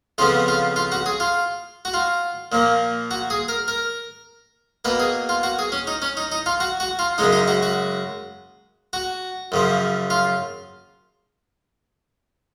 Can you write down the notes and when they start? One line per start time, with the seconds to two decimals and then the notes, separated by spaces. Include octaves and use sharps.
0.18 F2 C#3 F3 B3 F4
0.48 F4
0.76 F4
0.92 F#4
1.06 G#4
1.20 F4
1.85 F#4
1.94 F4
2.52 A#2 F3 A#3
3.11 F#4
3.30 G#4
3.48 A#4
3.68 A#4
4.85 B2 A#3 B4
5.00 G#4
5.29 F4
5.43 F#4
5.59 G#4
5.72 C#4
5.87 D#4
6.02 C#4
6.17 D#4
6.32 D#4
6.46 F4
6.60 F#4
6.80 F#4
6.99 F4
7.18 F#2 C#3 G#3 D#4
7.33 D#4
7.48 F#4
7.63 F#4
8.93 F#4
9.52 F#2 C#3 F3
10.10 F4